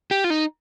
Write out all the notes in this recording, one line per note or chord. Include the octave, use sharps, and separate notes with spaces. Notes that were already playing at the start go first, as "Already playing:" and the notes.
G4
F4
D#4